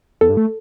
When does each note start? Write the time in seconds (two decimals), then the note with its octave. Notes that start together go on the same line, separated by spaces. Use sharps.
0.21 E2 A4
0.30 G2
0.37 A3